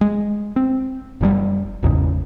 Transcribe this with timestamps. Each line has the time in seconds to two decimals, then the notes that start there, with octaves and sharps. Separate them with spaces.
0.01 G#3
0.56 C4
1.21 F#1 C#3 G3
1.83 G#1 E2 G#2 C#3